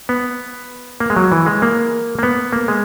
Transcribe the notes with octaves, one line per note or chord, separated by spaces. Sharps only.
B3
A#3
G#3
F#3
E3
G#3
A#3
A#3
B3
A#3
G#3